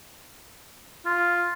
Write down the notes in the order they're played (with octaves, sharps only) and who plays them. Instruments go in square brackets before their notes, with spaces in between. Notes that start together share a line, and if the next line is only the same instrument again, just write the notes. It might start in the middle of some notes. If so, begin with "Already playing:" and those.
[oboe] F4